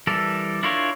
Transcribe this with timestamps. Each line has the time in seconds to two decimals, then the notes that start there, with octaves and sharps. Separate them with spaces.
0.07 E3 G3 A4 A#4
0.63 D4 E4 F4 A#4 C#5